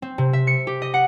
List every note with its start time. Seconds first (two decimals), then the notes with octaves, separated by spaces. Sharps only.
0.02 C4
0.18 C3
0.33 E5
0.47 C#7
0.67 G4
0.82 D#5
0.94 F#5